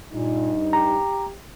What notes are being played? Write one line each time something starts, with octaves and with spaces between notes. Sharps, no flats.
G2 A#2 D#4
G4 A#5